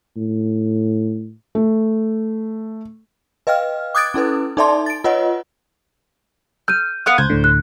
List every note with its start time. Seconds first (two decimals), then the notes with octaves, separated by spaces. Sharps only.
0.16 A2
1.55 A3
3.47 B4 D#5 F5 G5 F6
3.95 D6 D#6 F#6 G#6 A6 D7
4.14 C#4 E4 A4 B4
4.57 D#4 A4 D5 E5 A5 C6
4.86 A6 D7
5.04 F4 B4 C#5 D#5 F#5
6.68 F6 G6 D#7
7.06 B3 F5 D#6 F#6
7.18 C#2 C5 G#6
7.30 D2 A2 D3
7.44 F#6